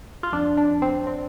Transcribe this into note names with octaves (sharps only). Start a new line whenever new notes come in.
F4
F2 D4
D4
F2
C4
C4